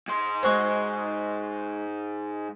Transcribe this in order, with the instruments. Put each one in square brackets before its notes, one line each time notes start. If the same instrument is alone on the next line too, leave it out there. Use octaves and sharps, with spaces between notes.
[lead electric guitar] G#2 C6
[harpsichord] G#3 F#4 C5